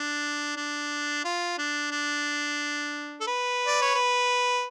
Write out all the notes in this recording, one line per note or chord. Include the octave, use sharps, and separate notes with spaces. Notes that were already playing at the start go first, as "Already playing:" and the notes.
Already playing: D4
D4
F4
D4
D4
A4
B4
D5
C#5
B4